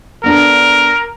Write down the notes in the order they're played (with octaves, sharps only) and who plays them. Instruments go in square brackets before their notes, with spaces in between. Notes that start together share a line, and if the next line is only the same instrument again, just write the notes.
[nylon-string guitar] B3 D4 A4 [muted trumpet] A#4